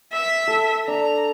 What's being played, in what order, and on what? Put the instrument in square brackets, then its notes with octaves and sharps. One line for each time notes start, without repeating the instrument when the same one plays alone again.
[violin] E5
[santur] A4
[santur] D4 [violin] A#5